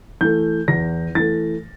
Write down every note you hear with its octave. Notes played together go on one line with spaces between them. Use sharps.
E3 A3 G6
E2 A#6
E3 A3 A6